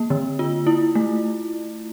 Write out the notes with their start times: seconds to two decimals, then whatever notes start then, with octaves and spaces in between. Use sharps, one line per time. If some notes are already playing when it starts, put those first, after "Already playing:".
Already playing: A#3
0.10 D3
0.39 F4
0.67 E4
0.95 A3